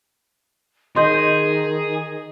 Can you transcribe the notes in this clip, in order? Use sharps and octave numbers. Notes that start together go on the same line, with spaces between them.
D#3 G#4 D#5 C6 G6